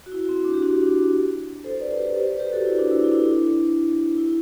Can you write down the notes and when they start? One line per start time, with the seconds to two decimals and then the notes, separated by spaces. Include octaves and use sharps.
0.06 F#4
0.12 E4
0.29 C4
0.45 D4
0.54 G4
0.62 D4 F#4
0.79 D4
1.64 A4 C5
1.80 B4 D5
1.97 G4 B4
2.14 A4 C5
2.27 B4 D5
2.39 G4 B4
2.52 F#4 A4
2.66 E4
2.79 D4
2.91 E4
3.04 E4
3.12 D4
3.16 E4
4.17 E4